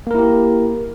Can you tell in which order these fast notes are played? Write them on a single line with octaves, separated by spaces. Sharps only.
A#3 A#4 E4 G4